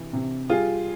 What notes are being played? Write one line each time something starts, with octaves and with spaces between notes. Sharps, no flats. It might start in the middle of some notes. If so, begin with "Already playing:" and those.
Already playing: C3 E3
C3
G3 F4 G#4